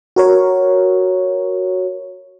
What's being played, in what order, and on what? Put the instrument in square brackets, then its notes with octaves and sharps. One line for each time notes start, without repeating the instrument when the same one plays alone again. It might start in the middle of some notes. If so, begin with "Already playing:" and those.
[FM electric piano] F#4 A#4 C#5